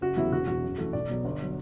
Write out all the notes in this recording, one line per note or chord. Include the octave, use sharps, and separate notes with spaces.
F#1 F#4
E2 C3 F#3 B3 E4
E1 F#4
E2 B2 F#4
F#2
E3 A3
B1 D5
B2 F#3 B3
G1
F#3